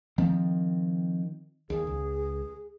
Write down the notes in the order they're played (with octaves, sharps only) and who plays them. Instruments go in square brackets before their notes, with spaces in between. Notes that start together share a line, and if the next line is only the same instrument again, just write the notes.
[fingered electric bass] D#3 F3 C4
[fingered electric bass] D#2 [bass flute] G#4
[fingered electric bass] C#2